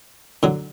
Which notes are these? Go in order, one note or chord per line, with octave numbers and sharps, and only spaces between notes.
D3 F#3